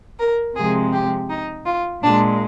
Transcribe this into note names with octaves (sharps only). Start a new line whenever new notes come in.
A#4
C3 F3 G#3 G#4
G4
D#4
F4
A#2 G#3 D4